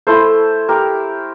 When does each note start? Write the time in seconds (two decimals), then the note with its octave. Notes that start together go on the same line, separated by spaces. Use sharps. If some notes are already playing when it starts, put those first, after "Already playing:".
0.07 A3 E4 A4 C5
0.68 G4 A#4